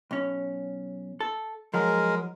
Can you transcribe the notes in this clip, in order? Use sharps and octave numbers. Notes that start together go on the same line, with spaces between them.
B1 C#4
A4
F3 F#3 G#3 A#4